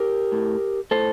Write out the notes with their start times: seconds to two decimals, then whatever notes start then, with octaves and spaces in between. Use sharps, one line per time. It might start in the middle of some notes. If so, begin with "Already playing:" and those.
Already playing: G4 A#4
0.32 A2
0.91 A2 A4 C5